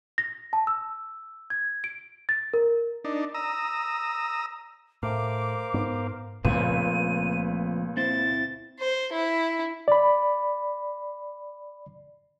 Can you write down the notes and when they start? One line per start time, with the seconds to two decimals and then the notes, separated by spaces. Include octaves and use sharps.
0.18 A#6
0.53 A5
0.67 E6
1.50 G#6
1.84 D7
2.29 A6
2.54 A#4
3.05 D4 D#4
3.34 A#5 D#6 E6
5.03 A2 A#4 C5 F5 D6
5.74 G#2 B3
6.45 C#2 A#2 F3 A3 C4 D#7
7.97 C4 E4 C5 A6
8.79 C5
9.13 E4
9.88 D5 B5